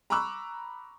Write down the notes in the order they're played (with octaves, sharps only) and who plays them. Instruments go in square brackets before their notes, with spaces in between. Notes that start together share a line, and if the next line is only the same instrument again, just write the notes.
[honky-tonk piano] A#5 B5 C#6 D6 E6 F#6